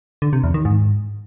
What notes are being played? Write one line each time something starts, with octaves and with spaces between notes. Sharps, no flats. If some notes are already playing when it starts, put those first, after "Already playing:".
D3
C3
E2
D#3
G#2